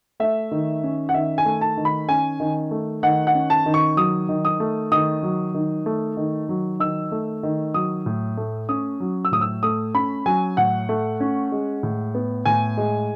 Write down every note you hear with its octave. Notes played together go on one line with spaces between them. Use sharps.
A3 E5
D#3
C#4
F#5
D#3 E5
G#5
A3
A5
D#3
B5
C#4 G#5
D#3
A3
D#3 F#5
F#5
C#4
A5
D#3
C#6
F#3 D#6
D#3
D#6
A3
D#3 D#6
F#3
D#3
A3
D#3
F#3
D#3 E6
A3
D#3
F#3 D#6
A2
A3
C#4 D#6
F#3
E6
A2 D#6
E6
A3 D#6
C#4 B5
F#3 G#5
A2 F#5
A3
C#4
G#3
A2
B3
A2 G#5
G#3